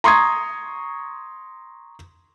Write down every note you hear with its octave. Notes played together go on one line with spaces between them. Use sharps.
A#5 C6 C#6 D#6 G#6